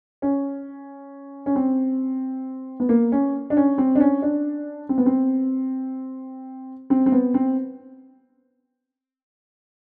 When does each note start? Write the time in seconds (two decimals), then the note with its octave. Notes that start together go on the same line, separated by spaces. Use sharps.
0.22 C#4
1.46 C#4
1.56 C4
2.80 B3
2.89 A#3
3.12 C#4
3.50 D4
3.57 C#4
3.78 C4
3.95 D4
4.00 C#4
4.22 D4
4.89 C4
4.98 B3
5.06 C4
6.90 C4
7.06 C4
7.12 B3
7.34 C4